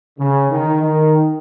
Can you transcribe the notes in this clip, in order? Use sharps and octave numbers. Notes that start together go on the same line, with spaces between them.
C#3
D#3
D#3